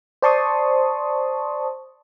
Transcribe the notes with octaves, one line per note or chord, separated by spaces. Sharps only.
C5 D5 A5 C6 C#6 D#6